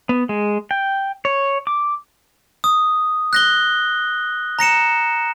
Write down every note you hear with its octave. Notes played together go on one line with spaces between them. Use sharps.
B3
G#3
G5
C#5
D6
D#6
F#6 A#6 G7
A#5 A#6 C#7 E7